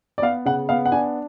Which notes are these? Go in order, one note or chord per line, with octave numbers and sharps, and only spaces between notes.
D5
B3 F5
C#3 F#5
B3 F5
F#5
D4 G#5